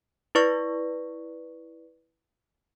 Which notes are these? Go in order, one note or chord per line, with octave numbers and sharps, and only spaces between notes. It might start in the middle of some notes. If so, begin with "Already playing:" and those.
E4 B4 D5 C#6 A#6